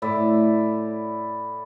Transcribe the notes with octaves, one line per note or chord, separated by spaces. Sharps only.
A2 E4 D5